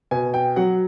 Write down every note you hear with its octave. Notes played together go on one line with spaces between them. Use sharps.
B2 G#5
G5
F#3 F#5